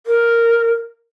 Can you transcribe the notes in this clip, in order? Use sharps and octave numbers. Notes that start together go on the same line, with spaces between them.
A#4